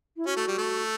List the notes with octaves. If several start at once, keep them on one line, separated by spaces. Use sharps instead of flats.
E4
C#4 F#4
A3
G3
A3